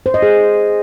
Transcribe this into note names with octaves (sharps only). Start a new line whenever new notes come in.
C5
D#5
G#4